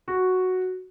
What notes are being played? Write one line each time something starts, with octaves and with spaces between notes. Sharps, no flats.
F#4